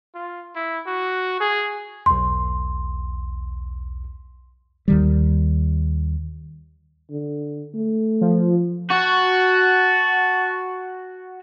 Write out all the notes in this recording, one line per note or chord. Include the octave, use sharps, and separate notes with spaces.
F4
E4
F#4
G#4
B1 E2 C6
D#2 D#3 G3
D3
A3
F3
F#4 A5